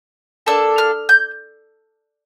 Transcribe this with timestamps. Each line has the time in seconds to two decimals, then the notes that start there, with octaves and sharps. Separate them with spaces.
0.46 A#3 D4 A4 E6
0.78 F6
1.09 G6